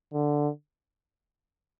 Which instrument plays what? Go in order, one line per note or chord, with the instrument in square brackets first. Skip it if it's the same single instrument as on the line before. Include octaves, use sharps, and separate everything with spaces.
[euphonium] D3